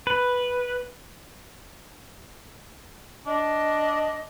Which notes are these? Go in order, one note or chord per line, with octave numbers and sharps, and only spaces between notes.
B4
D4 D#5